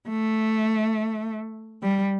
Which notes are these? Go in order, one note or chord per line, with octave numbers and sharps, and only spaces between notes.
A3
G3